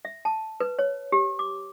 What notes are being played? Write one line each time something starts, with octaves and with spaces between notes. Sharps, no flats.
E5
A5
B4
C#5
G4
D6